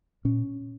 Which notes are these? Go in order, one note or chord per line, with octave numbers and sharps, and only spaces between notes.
A#2 C#4